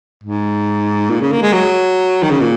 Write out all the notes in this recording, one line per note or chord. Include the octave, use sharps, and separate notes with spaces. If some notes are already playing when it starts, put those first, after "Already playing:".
G#2
A#2
C#3
A#3
G#3
F#3
D#3
C#3
A#2